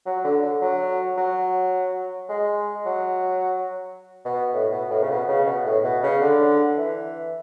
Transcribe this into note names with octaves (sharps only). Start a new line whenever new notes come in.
F#3
D3
D3
F#3
F#3
G#3
F#3
B2
A2
B2
A2
C#3
B2
C#3
B2
A2
B2
C#3
D3
E3